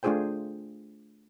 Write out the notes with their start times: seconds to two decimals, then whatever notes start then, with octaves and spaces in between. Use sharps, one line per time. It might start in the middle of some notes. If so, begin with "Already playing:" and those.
0.03 A3 D4 F4 G#4 C5 G5